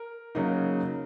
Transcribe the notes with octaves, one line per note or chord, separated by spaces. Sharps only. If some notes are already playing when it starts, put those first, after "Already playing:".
Already playing: A#4
C#3 F#3 A#3 D#4